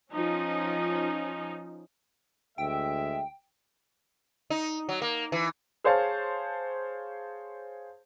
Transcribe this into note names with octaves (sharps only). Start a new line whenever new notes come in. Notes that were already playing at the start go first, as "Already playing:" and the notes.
F3 C#4 D#4
D2 G#3 E5 G5
D#4
F#3
A#3
E3
G#4 C5 C#5 F5 A5